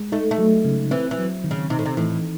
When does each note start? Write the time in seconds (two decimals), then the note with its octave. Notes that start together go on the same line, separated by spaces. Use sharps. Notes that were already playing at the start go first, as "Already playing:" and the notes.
Already playing: G#3
0.12 A3 D#4
0.31 A3
0.38 F#3
0.65 C#3
0.91 E3 C4
1.11 E3
1.18 F#3
1.44 D#3
1.51 C#3
1.70 C3 D#4
1.79 A2
1.85 C3
1.97 A2 E3